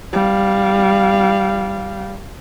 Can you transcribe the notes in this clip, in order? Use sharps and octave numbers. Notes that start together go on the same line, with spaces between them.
G3 F5